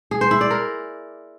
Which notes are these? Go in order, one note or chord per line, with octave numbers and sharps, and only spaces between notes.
G#4
C5
E4
D5
A#4